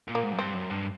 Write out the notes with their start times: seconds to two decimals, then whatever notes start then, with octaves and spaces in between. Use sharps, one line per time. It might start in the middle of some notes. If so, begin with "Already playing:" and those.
0.08 A#2
0.15 A#3
0.24 G#2
0.33 F#2
0.39 G2 C4
0.55 F#2
0.70 G2